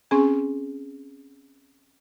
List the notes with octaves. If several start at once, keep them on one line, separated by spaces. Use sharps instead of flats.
C4 C#4 G#4 G#5